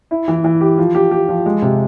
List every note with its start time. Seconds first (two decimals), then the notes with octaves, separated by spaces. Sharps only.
0.11 E4
0.28 E3
0.44 E3
0.61 G4
0.78 F3
0.95 G4
1.11 G4
1.29 F3
1.46 G#3
1.62 C3